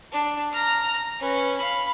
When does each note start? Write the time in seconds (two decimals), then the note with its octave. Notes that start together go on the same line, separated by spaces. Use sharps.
0.12 D4
0.52 A#5 F6
1.20 C#4 B4
1.57 F5 B5